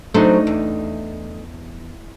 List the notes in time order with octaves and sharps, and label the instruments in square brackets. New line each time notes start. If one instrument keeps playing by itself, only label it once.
[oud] F#3 A4 C5 [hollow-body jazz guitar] A3 D4 D#4
[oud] E2